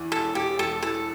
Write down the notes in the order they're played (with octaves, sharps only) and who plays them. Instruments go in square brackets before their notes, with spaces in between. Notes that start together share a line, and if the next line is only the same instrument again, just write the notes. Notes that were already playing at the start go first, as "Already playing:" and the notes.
Already playing: [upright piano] E2 E3
[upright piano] E1 [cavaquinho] A4
[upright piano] E1 [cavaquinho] G4
[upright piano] E2 [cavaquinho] A4
[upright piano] E3 [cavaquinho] A4